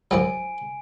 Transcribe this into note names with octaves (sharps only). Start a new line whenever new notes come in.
F#2 F3 F#3 G#5 D7